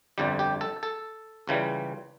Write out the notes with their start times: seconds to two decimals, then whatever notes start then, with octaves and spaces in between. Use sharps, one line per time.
0.18 G1 F2 D3 G3 G4
0.39 G4
0.61 A4
0.83 A4
1.47 C#2 C#3 E3 G3